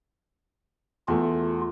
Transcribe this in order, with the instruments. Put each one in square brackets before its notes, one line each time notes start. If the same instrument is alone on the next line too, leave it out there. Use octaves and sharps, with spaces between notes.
[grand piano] E2 A3 [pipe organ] F4